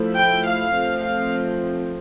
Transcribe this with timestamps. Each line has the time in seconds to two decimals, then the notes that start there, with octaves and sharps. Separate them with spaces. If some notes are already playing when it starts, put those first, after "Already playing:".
Already playing: F3 A3 E4
0.17 G5
0.47 F5
0.74 F3 A3 C4
1.04 F5